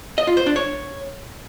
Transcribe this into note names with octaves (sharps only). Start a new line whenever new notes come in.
D#5
F4
C5
D4
C#5